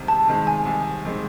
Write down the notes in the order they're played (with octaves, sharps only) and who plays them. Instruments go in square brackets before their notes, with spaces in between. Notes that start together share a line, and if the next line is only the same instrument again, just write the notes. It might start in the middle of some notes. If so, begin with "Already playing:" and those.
Already playing: [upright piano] C2 C3 D#3 G#3
[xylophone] A5
[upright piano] C3 D#3 G#3
[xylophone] G#5
[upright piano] C2
C3 D#3 G#3